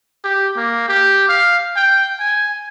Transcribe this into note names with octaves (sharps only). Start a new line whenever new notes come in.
G4
A#3
G4
F5
G5
G#5